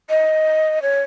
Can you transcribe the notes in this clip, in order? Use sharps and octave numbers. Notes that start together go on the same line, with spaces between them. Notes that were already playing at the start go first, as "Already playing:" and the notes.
D#5
C#5